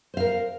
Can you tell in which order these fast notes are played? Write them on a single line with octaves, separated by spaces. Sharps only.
C5 F5 A#4